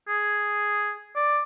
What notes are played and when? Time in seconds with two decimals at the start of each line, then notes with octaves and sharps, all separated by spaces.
0.09 G#4
1.16 D5